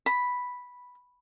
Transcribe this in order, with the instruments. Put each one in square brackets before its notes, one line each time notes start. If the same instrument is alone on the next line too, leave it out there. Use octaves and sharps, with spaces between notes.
[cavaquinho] B5